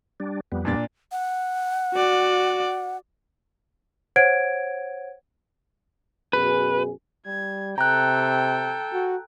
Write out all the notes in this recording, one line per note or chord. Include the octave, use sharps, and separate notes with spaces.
G3 D4
F2 G3 B3
A#2 D4 A6
F#5
F#4 D5
C5 C#5 F#5 G#6 D7
F#2 B2 G#4 B4
G3 G#6
C3 A4 G5 A#5 F#6
F#4